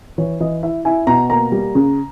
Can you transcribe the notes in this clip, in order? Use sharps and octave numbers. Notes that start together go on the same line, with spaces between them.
E3 C#5
E3 D#5
E4 E5
E4 G#5
B2 A#5
A#3 A#5
G3
C#3